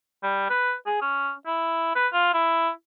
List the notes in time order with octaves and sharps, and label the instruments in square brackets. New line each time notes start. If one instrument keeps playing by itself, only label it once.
[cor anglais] G3
B4
G#4
C#4
E4
B4
F4
E4